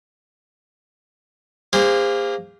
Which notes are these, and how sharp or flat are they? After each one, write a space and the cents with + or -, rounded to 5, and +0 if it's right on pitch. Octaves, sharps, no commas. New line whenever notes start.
A#3 +0 G#4 -45 C5 -10